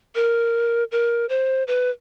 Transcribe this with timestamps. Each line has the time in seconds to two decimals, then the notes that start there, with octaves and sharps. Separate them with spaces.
0.15 A#4
0.92 A#4
1.29 C5
1.67 B4